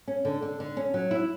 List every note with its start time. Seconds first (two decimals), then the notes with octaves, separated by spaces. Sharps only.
0.08 C#4
0.25 D3
0.42 D3
0.60 D3
0.77 C#4
0.94 F#3
1.11 E4